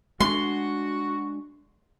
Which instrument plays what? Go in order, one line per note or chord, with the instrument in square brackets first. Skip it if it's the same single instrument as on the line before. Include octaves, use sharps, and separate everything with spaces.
[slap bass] G#3 C4 D4 [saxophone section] F#4 [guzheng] C6